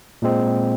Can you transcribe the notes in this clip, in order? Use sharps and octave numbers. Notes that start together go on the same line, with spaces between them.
A#2 G#3 C4